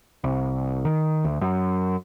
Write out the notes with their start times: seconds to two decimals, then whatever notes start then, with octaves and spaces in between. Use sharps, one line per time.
0.24 C2
0.85 D#3
1.25 D2
1.41 F#2